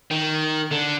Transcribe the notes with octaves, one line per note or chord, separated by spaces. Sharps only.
D#3
D3